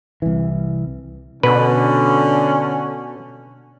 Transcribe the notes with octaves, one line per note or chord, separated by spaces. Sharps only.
C2 E3
B2 D3 C#4 B4